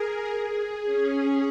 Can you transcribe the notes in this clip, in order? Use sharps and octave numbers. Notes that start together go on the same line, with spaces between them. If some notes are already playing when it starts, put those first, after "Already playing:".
Already playing: G#4 A#4
G#4
C#4